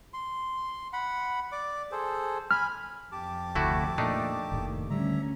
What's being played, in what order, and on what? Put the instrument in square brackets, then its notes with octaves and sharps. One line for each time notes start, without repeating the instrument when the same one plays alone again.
[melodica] C6
F#5 B5
D5 D6
G#4 A4 C5
[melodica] G#5 B5 [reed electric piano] F6
[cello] F2 [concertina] G4 A5 D6
[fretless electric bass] F1 D2 [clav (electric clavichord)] A3 E4 F#4
[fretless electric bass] A#2 [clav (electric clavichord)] A3 D4 D#4
[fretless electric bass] F1 A2 D#3 [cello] D#2
[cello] D2 C#4 [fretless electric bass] D3 G3 [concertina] E5 A#5